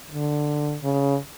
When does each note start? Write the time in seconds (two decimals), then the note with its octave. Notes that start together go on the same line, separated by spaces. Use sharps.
0.11 D3
0.83 C#3